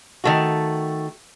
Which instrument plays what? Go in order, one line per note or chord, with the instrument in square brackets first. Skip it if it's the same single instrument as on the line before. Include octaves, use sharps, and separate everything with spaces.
[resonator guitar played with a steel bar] D#3 A3 F#4